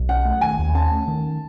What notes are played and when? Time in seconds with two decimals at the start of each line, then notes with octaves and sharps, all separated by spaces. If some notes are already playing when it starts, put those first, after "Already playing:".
Already playing: B1
0.09 C#4 F#5
0.25 A3
0.41 D#3 G#5
0.58 D#2
0.75 C#4 A5
0.91 A3
1.07 D#3